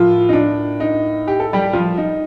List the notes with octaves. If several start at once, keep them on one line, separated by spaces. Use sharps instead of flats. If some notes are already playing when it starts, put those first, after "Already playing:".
Already playing: A2 F3 A#3 F4
D#4
D4
D#4
G4
A4
G3 G4
F3 F4
D#4